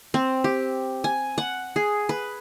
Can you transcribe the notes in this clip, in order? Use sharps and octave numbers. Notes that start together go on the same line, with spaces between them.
C4
G4
G#5
F#5
G#4
B4